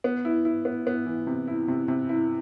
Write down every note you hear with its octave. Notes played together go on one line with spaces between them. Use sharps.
B3
E4
E4
B3
B3
E3
C3
E4
C3
C3
E4